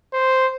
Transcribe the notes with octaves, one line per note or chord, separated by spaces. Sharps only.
C5